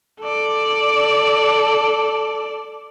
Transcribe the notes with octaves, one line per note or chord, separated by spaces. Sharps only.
A4 D5